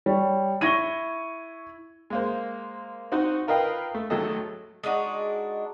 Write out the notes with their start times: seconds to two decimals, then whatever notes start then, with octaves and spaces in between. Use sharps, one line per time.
0.06 G3 C#5
0.61 E4 C#6 G#6 A#6 D#7 G7
2.10 G#3 A#3 C5
3.12 C4 D#4 F#4 C5
3.48 F4 A#4 B4 D#5 F5 G5
3.94 A3
4.10 G#1 F#3 A3 A4 D#5
4.83 G#3 D4 D#4 F#4